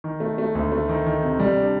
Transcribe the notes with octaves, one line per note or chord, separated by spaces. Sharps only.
D#3
A3
A3
D2
A3
D#3
D#3
C3
G3
D4